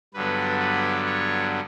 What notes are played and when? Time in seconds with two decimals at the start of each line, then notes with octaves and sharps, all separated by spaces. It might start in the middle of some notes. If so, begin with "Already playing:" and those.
0.14 G2 D3 F#3 B3 B4
0.60 B4
1.06 C#5